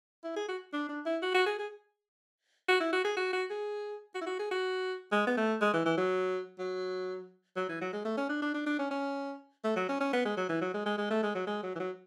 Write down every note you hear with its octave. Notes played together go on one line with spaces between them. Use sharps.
E4
G#4
F#4
D4
D4
E4
F#4
F#4
G#4
G#4
F#4
E4
F#4
G#4
F#4
F#4
G#4
F#4
E4
F#4
G#4
F#4
G#3
B3
A3
G#3
E3
E3
F#3
F#3
F#3
E3
F#3
G#3
A3
C#4
D4
D4
D4
D4
C#4
C#4
A3
F#3
C#4
C#4
B3
G#3
F#3
E3
F#3
G#3
G#3
G#3
A3
G#3
F#3
G#3
F#3
E3
F#3